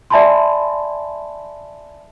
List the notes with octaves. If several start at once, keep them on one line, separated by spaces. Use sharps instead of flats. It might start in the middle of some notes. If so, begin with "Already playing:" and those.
D5 E5 G#5 A5 B5 C6